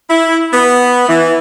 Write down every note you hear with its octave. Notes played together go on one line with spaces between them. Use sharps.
E4
B3
E3